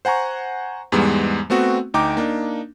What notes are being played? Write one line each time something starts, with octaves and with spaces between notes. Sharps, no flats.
C5 F#5 G#5 A#5 C#6
E2 G#2 G3 G#3 B3
A3 B3 C4 F#4
D2 D#4 G5 A#5 D6
A#3 D4 D#4